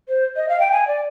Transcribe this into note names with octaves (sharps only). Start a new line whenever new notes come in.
C5
D#5
F5
G5
G#5
D5